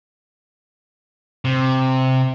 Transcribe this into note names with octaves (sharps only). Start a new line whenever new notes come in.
C3